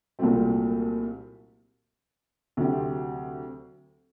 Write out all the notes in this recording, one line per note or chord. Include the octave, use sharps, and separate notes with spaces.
C2 A#2 F#3 A3 C4
D2 C3 F#3 C4 G4